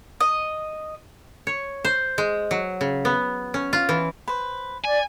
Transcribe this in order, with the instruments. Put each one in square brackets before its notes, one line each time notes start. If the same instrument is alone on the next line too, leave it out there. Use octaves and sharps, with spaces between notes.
[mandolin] D#5
[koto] C#5
C5
G#3
F#3
C#3
B3
C#4
F4
E3
[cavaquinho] B4 C5
[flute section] D5 [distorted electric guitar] G#5